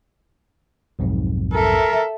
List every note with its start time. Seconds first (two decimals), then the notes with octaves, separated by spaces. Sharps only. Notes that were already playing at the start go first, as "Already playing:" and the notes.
0.99 B1 F2 G#2
1.54 A4 A#4 E5